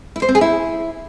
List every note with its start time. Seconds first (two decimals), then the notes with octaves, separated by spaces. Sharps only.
0.16 E4
0.22 C5
0.28 C4
0.35 G#4
0.41 E4